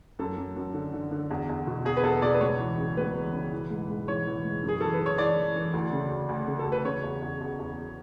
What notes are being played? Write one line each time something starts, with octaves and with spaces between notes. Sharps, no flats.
F#2 A4
F#2
F#2
D3
D3
D3
E2
E2
B2
E2 G#4
B4
E2 A4
B2 D5
B4
C#2 C#5
E3
C#3
C#2 B4
E3
C#3
E3
G#2
G#2
E3 C#5
E3
G#2
F#2
G#4
E3 A4
B4
E3
C#5
E3 D5
E3
E3
D2
C#3
D2
D2
C#3
A4
D2
B4
C#3 C#5
E2
E2
E2
E2